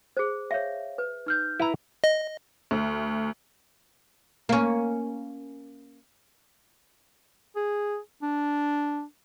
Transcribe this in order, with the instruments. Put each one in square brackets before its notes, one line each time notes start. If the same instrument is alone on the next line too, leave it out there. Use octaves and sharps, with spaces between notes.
[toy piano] G#4 C5
[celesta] C#5 F5 [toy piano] E5
[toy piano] B4
[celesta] D#4 F6 G6
[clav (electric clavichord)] E4 B4 A#5
[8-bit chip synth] D#5
[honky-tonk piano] D2
[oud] A#3 C#4
[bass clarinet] G#4
D4